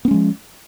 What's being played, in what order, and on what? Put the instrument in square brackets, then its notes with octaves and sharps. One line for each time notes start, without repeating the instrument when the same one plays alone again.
[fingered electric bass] B3
C#4
G#3
F3